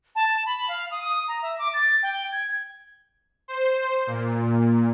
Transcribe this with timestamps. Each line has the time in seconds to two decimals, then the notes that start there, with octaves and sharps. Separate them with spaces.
0.15 A5
0.46 B5
0.68 F5
0.91 D#6
1.03 D#6
1.28 A#5
1.42 E5
1.59 D6
1.74 A6
2.03 G5
2.32 G#6
3.48 C5
4.07 A#2